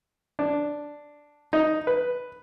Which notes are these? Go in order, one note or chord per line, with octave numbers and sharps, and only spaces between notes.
D4
D#4
B4